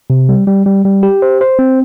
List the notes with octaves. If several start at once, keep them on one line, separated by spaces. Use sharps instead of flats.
C3
G3
G3
G3
G3
G4
C5
C5
C4